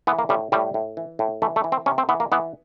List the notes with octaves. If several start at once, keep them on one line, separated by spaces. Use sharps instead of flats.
E3 B3
A#3
A2 G3
A2 G3
A2
E3
A2
E3 A3
A3
E3
C4
C3 C#4
C4
E3 B3
A#3
E3 B3